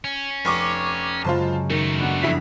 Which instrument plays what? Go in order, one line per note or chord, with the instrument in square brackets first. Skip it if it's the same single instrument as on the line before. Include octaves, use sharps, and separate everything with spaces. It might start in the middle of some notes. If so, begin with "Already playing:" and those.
[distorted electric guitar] C#4
[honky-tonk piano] F1 C#6 D6
[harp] F#2 C#3 G#3 [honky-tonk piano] F4 C5 A5
[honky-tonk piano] D#3 [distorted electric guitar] A3 D#4
[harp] B3 D4 F#4
[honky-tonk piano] F2 E4 B6